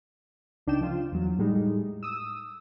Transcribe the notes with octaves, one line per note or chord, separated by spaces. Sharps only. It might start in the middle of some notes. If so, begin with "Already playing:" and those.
C#2 D4 D#4 G5 E7
F3 F4
E2 F#3
A2 G3 G#3 D#4
D#6 E6